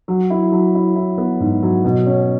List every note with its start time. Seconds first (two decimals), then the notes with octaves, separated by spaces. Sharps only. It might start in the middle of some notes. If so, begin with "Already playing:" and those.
0.08 F#3
0.30 E4
0.52 F#3
0.75 E4
0.96 E4
1.18 B3
1.40 G#2
1.63 F#3
1.85 B2
2.06 C#4